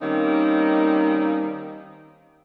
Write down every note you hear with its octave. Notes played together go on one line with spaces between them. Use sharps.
D#3 G3 A#3 C4 C#4 D#4